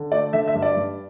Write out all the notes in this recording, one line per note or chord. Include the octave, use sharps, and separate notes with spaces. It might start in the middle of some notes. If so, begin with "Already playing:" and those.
Already playing: D3
A3 D5
D3 E5
E5
G2
D5
G2